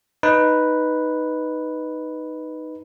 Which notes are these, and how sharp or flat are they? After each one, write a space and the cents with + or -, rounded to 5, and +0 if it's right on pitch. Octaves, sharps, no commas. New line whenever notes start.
D#4 +0 B4 +0